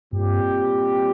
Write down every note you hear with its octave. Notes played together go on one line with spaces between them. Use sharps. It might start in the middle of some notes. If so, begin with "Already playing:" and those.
G2 A#2 G3 C4 G4